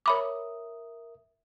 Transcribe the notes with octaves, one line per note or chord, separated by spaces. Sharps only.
A#4 C#5 E5 B5 D6 D#6